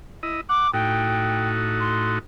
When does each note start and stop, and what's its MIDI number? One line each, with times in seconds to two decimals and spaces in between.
0.23 0.41 64
0.23 0.41 75
0.49 0.68 78
0.49 0.73 86
0.74 2.19 45
0.74 2.19 63
0.74 2.19 66
0.74 1.49 79
1.80 2.16 84